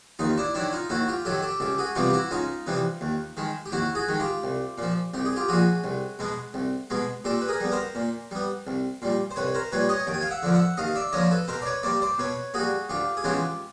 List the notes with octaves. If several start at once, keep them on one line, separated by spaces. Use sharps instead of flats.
D#2 D#4 F4
D4 E4
D#3 F#3 D4 E4
D#4 F4
D#2 E4 F#4
F4 G4
D#3 F#3 G4 A4
G4 A4
C#2 G4 A4
F#4 G#4
C3 E3 G3 B3 F4 G4
G4
E4 F#4
C#2 D#4 F4
C3 E3 G3 B3
D#2
D#3 G#3
G4
D#2 E4 F#4
F#4 G#4
D#3 G#3
F4 G4
C2
A#2 F3
C2 G4
G#4
F4 G4
A#2 F3 F#4 G#4
C2
B2 G#3 B3
C2
B2 G#3 B3
A#2 G4 A4
B4
G#4 A#4
G3 B3
A#4 C5
A#2
G3 B3
C2
A#2 G3
C5
C2 B4 C#5
A#4 C5
A#2 G3 B4 C#5
C#5 D#5
D#2 G5
G#5
F5 G5
E5 F#5
D3 F3 A#3
E5 F#5
D#2 D#5 F5
D5 E5
D3 F3 A#3 C#5 D#5
A4 B4
B2 A#4 C5
D5
B4 C#5
G3 A#3 C5 D5
C5 D5
B2 B4 C#5
G3 A#3 F#4 G#4
D2 F4 G4
G#4
C#3 E3 G#3 B3 F4 G4